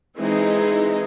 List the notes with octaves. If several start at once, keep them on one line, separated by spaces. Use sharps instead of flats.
E3 G#3 C4 D#4 G#4